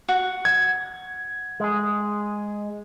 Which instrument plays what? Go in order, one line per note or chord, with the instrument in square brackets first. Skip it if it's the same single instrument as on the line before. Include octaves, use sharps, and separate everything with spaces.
[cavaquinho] F#4
[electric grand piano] G#6
[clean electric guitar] G#3 G#4